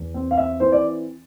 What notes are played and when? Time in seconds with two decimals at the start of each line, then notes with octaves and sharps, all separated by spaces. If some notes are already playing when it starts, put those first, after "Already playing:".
Already playing: E2
0.14 C4
0.31 F5
0.38 E5
0.60 E3 C5
0.72 D5